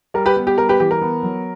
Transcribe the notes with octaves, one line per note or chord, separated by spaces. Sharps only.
G3 A#4
G4 B4
B3
G4
G3 A#4
G4 B4
E3 G4
A#4
B3
F#3